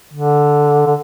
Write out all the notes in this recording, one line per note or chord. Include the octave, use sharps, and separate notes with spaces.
D3
D3